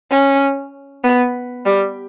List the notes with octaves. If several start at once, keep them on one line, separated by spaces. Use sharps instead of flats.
C#4
B3
G3